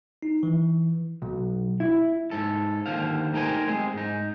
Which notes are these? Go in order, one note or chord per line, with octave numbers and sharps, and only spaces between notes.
D#4
E3
B1
E4
G#2 A4
D#2 D3 C5 F5
A3 D#4 G4 A#4 C5 G#5
G#3 C4 G#4
G#2 D#4